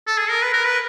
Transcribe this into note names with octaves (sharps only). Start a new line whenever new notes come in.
A4
G#4
A#4
B4
A#4
B4